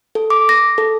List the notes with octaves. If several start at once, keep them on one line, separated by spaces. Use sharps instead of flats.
A4
D6
A#6
A4